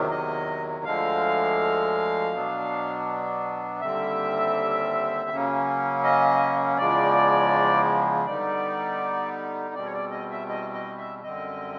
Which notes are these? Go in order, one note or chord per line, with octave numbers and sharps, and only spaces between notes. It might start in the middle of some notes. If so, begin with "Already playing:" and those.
Already playing: E2 C3 D#3 F#3
D#5
D2 D3 F3 G#3 F5
B2 F#3 B3 D4
D#2 D3 G3 C4 E5
C#3 F#3 A#3 C#4
D#5
E2 C#3 F3 G#3 D5
D3 G3 B3 D#4 D5
E2 B2 G3 C4 D5
C#5
D5
D#5
E5
D#5
D#5
E5
F#2 D3 G3 C4 D#5